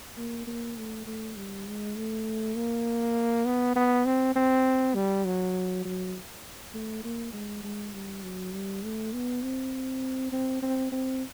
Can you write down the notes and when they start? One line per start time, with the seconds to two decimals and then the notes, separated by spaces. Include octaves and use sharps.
0.17 A#3
0.47 A#3
0.77 A3
1.06 A3
1.36 G3
1.67 G#3
1.96 A3
2.56 A#3
3.45 B3
3.76 B3
4.05 C4
4.35 C4
4.95 G3
5.25 F#3
5.85 F#3
6.74 A3
7.04 A#3
7.33 G#3
7.63 G#3
7.93 G3
8.23 F#3
8.52 G3
8.83 A3
9.13 B3
9.43 C4
10.32 C4
10.62 C4
10.92 C4